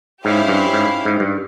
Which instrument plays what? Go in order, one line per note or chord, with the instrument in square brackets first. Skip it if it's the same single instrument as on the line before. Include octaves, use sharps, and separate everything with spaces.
[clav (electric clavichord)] G#2 [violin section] C#4 E4 G4 C5 F5
[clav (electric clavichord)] G2
G#2
G#2
G2